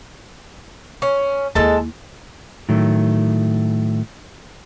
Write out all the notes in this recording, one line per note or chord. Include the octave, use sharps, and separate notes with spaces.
C#4
D#2 G#3 E4 A4 A5
A2 D#3 F#3 A3